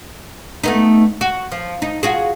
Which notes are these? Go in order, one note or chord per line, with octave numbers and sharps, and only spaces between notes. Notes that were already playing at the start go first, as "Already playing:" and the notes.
A3 B3 D#4
F#4
F3
D#4
F4 F#4 G#4